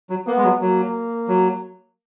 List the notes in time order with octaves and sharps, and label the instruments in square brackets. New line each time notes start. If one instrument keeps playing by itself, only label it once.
[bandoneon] F#3
[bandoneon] A#3 [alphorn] B3
[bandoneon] G#3
F#3
[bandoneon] F#3 [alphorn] A#3
[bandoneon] F#3